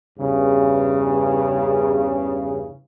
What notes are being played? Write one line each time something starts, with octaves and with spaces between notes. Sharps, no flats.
E2 G2 C#3